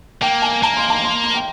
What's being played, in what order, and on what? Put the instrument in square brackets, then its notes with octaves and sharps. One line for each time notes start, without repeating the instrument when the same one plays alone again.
[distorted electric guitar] A#3 [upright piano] G5
[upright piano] G#5
[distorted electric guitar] A#3 [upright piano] A#5
[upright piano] C6
A#5
C6
C6
G5